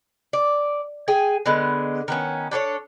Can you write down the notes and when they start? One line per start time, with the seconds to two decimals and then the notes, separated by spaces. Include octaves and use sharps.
0.33 D5
1.08 G#4 G5 G#5
1.46 D3 G#3 B3
2.08 D#3 B3 C#4
2.51 D4 A4 C5 C#5